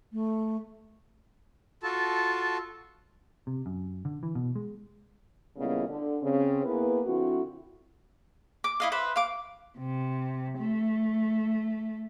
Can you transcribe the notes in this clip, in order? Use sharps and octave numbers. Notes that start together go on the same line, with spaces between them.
A3
F4 F#4 A4 A5
C3
F#2
D3
E3
B2
G#3
A#2 C#3 G3 G#3 B3 E4
D3
C#3 C4
A#3 B3 E4 G#4 B4
D3 F3 C4 E4 F#4
D6
E4 D#5 F5
B4 C5 E5
F5 D6
C3
A3